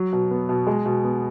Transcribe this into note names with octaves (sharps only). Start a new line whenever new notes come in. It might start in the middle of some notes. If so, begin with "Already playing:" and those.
Already playing: F#3
B2
B3
B2
G#3
B2
B3